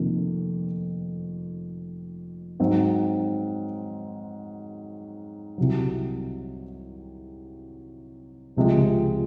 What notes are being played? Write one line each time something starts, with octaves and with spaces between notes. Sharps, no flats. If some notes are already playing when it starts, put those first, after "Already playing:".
Already playing: F1 F2 D#3 A#3
G#2 F#3 C4
C2 C3 F#3
C#2 C3 F3 G#3